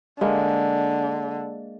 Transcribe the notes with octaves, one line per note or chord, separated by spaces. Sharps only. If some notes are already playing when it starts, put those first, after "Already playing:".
D3 G#3 A#3